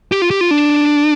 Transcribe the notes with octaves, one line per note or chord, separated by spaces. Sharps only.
G4
F4
G4
F4
D4